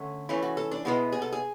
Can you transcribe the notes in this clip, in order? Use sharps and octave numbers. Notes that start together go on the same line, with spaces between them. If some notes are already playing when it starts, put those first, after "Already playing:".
Already playing: D3 A3 C#4
E3 A3 C#4 E4
F#4
A4
D4
B2 G#3 B3 E4
G#4
A4
G#4